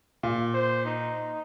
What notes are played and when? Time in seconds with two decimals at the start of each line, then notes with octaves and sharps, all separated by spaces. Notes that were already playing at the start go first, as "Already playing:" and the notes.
0.23 A#2
0.54 C5
0.85 D#4